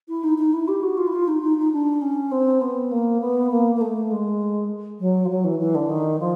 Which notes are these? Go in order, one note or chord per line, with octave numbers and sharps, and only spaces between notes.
E4
D#4
D#4
E4
G4
F#4
F4
E4
F4
D#4
D#4
D#4
D4
C#4
C4
B3
A#3
B3
A#3
A#3
A3
G#3
F#3
F3
F#3
E3
E3
D3
D#3
F3